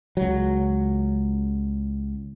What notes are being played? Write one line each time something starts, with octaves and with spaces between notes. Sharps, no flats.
C#2 F#3